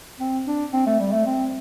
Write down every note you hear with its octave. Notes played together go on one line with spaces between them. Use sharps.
C4
D4
C4
A3
G3
A3
C4